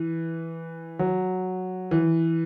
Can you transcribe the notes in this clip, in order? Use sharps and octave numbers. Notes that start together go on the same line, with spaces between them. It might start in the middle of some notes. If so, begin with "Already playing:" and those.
Already playing: E3
F#3
E3